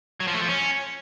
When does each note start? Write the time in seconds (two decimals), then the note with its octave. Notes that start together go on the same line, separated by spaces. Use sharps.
0.20 F#3
0.27 F3
0.34 A3
0.41 F3
0.48 C#4